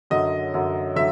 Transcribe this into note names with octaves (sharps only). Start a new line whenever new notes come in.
F#2 D3 F#3 D#5
F#2 D3 F#3
D3 F#3 E5